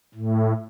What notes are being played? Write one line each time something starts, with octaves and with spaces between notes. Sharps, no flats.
A2